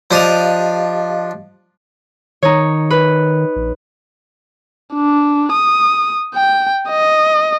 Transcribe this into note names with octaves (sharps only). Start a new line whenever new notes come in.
F3 D4 G4 D#5 F5 D#6
D#3 D#4 C#5
B4
A#1
D4
D#6
G5
D#5